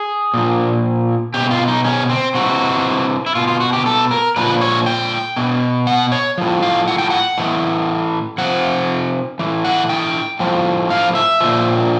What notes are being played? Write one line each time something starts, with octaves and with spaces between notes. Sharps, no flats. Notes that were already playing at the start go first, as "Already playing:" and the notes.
Already playing: G#4
A#2 F3
B2 G4
F4
D#4
C#4
C4
C3 E3 F#4
E4
B2 F4
F4
F#4
G4
A4
A#4
A#2 F3 B4
C#5
G5
B2
F#5
C#5
A2 F3
F5
F#5
G5
F#5
A2 E3
C3 F3 F#5
A2 E3
F#5
G5
A2 F3
F5
E5
A#2 F3